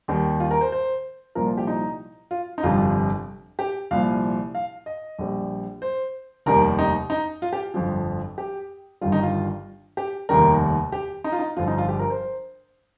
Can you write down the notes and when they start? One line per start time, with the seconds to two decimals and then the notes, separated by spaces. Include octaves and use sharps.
0.08 D#2 D#3 G3
0.40 F4
0.51 A#4
0.61 C5
0.72 C5
1.35 C2 A#2 F3 A#4
1.46 F4
1.57 G4
1.67 D#4
2.31 F4
2.58 D#4
2.63 G1 F2 C3 G3 F4
3.59 G4
3.91 C2 A#2 F3 F5
4.55 F5
4.86 D#5
5.19 A#1 A#2 G3
5.82 C5
6.46 F1 D#2 D#3 G3 A#4
6.79 D#4
7.10 D#4
7.42 F4
7.53 G4
7.74 G1 F2 F3
8.38 G4
9.01 G1 G2 D#3 G3 F4
9.12 D#4
9.23 F4
9.97 G4
10.29 F1 D#2 D#3 G3 A#4
10.92 G4
11.24 D#4
11.32 F4
11.39 D#4
11.57 G1 G2 F3 F4
11.68 D#4
11.78 F4
11.89 G4
11.99 A#4
12.10 C5